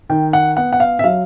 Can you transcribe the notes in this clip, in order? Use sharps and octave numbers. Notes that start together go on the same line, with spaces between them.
D#3 G5
F#5
B3 F#5
F#5
F5
E5
F#3 F5